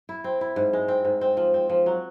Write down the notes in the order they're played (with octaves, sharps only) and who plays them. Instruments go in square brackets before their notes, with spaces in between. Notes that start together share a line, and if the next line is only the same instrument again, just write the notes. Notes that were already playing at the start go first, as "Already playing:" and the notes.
[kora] E4
C4
E4
G#2
G#3
C4
G#2
C4
F3
C4
F3
F#3